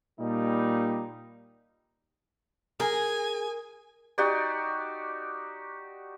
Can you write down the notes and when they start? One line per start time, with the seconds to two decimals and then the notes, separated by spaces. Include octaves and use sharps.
0.20 A#2 G3 D#4
2.80 G#4 A#4 G#5
4.18 D#4 F#4 G4 D5